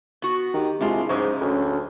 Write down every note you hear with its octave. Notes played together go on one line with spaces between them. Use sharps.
B3 F#4
D#3 G4
C3 G#3 D4 E4 F4
G#2 C#3 F#3 G4 G#4 C5
D2 C#4